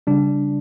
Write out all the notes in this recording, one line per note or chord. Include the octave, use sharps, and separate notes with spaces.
C#3 G3 D4